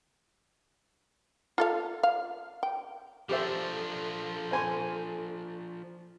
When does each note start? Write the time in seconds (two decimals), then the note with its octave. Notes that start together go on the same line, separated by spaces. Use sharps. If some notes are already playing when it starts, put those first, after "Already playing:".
1.58 F4 A4 F5
2.03 F5
2.63 G5
3.29 F3 D4 G4 A4 C5 E5
4.51 C5 G#5 C6